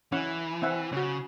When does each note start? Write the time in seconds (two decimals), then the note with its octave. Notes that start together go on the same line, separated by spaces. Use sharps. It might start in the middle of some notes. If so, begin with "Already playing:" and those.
0.12 E3 C#4 F#5
0.62 C4 E5 F#5
0.93 C#3 C#4 F#4